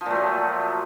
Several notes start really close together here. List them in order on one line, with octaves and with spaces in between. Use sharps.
F3 A#2 A3 F#3